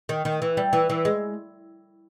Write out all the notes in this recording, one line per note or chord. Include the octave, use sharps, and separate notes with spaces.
D#3
D#3
E3
G3
E3
E3
G#3